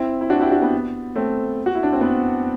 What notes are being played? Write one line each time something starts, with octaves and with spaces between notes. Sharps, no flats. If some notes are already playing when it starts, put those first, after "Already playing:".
Already playing: C4 E4
E4
D4 F#4
E4 G4
D4 F#4
B3
A3 C4
F#4
E4
D4
C4
B3